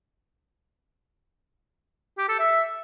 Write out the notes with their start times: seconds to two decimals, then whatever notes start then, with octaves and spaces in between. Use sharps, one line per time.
2.18 G4
2.29 A4
2.39 E5